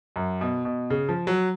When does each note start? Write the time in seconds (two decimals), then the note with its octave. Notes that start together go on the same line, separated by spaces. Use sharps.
0.16 F#2
0.41 B2
0.65 B2
0.90 C#3
1.09 F3
1.27 F#3